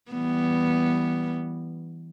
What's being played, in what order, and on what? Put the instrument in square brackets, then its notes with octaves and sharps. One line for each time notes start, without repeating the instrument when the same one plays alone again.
[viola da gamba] E3 G3 B3